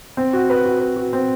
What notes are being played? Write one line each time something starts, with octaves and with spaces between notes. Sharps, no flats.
C4
F#4
B4
F#4
B4
F#4
C4